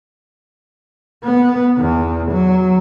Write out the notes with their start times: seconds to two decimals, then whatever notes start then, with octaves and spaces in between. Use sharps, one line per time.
1.25 B3
1.79 E2
2.31 F#3